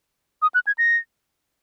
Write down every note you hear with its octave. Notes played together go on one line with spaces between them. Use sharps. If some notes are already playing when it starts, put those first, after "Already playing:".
D#6
F#6
G#6
A#6